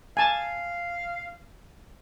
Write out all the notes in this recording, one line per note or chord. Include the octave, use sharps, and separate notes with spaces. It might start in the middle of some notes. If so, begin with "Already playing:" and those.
F5 G#5 A5